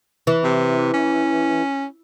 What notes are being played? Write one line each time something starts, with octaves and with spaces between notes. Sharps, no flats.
E3
C3
C#4